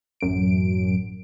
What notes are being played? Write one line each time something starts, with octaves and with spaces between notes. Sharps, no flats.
A1 F#2 D7